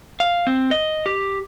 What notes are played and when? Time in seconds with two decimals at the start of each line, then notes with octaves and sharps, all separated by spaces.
0.20 F5
0.47 C4
0.71 D#5
1.06 G4